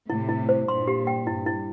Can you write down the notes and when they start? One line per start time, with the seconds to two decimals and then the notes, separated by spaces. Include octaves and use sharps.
0.09 A2 C3 E4
0.29 E4
0.49 C5
0.68 G2 A#2 C6
0.88 G4
1.07 G5
1.27 G2 E4
1.46 E4